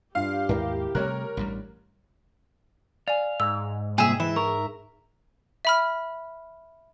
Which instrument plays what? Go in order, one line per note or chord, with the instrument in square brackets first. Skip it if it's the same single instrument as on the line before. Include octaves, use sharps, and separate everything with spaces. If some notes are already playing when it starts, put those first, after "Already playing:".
[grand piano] G2 F4 [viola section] G4 [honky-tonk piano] F5
[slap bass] D#2 G#2 [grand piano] E4 A#4
[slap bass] C3 G3 A3 [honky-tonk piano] A#4 [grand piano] C#5 F#6
[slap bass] A1 G2 G3
[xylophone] D5 G#5 [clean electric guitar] F5
[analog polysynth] G#2 [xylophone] E6
[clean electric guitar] C2 A#2 [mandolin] G#4 E5
[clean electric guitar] E3 [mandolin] E5 [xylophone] B5
[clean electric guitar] A#4 [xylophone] C#6
[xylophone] E5 B5 F6